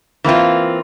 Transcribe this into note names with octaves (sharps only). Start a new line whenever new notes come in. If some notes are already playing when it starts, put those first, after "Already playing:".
E3 A#3 C4 F4